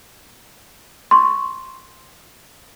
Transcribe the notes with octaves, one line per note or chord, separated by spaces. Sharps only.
C6 C#6